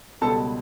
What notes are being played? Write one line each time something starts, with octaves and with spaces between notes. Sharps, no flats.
C#2 B2 G3 B3 A4 A5